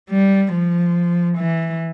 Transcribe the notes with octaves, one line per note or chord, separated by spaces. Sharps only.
G3
F3
E3